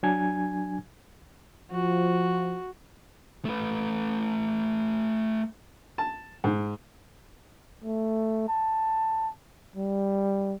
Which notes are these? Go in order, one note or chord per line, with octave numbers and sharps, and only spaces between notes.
F#3 D4 G#5 G#6
F3 F#4
A3 B4
A5
G#2
A3
A5
G3